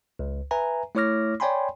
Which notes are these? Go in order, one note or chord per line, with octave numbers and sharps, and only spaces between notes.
C#2
B4 E5 G#5 A#5
A3 E4 C#5 D6 F6 A#6
C#5 D5 G5 G#5 B5 C6